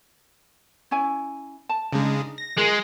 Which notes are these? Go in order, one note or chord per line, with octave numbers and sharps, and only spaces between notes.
C#4 E4 G#5
A5
C#3 G#3 D4 D#4
A#6
G#3 F4 G#4 A#4